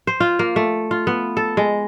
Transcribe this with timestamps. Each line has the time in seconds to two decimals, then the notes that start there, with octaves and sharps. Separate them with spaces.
0.07 C5
0.20 F4
0.39 A#3
0.56 A3
0.91 F4
1.07 B3
1.37 A4
1.57 G#3